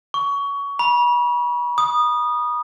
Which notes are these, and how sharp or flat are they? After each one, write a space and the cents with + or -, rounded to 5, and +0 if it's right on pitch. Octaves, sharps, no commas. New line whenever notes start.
C#6 +25
B5 -35
D#6 -20